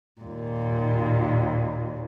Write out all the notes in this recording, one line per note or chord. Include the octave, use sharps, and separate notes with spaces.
D#2 A#2